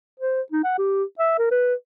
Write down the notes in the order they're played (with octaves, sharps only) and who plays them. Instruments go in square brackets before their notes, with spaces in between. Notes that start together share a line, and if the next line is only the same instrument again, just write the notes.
[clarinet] C5
D#4
F#5
G4
E5
A#4
B4